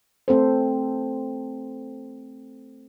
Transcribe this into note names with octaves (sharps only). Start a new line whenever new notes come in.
A3 C4 A4 C5